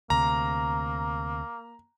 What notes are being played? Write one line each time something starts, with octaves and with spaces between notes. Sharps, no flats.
D2 C3 A#3 A#5